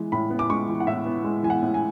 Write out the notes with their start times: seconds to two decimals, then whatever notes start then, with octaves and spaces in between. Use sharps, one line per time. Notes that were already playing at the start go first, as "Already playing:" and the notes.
Already playing: E3 G#3
0.12 A2 B5
0.30 B3
0.39 D6
0.50 G#3 C#6
0.68 E3
0.80 F#5
0.87 A2 E5
1.06 B3
1.24 G#3
1.43 E3 G#5
1.50 F#5
1.62 A2
1.74 G#5